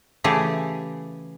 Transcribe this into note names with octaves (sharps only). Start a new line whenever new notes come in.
C#3 E3 A3 G4 G#4